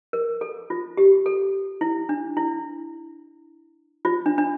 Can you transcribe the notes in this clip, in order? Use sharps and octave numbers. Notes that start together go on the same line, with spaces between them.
A#4
A4
F4
G4
A4
E4
D4
E4
F4
D4
D4